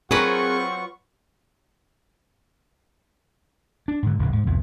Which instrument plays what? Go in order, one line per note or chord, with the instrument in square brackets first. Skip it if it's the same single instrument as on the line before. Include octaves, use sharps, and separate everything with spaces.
[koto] F#3 B4 [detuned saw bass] C4 [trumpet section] F4 F#5 C#6 [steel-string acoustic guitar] G#4 A#4
[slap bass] D4
G#2 D3
D1 A#1 D#2 C#3
G#2
C2 F2 B2